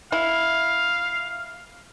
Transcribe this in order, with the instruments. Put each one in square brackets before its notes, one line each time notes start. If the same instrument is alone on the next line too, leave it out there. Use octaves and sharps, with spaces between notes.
[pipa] E4 [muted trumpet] F5